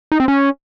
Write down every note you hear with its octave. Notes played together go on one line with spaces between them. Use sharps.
D#4
C4
C#4